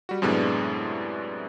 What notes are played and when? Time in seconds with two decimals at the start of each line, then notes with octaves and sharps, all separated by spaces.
0.09 G3 F#4
0.22 F#2 A2 C3 G#3 B3 D4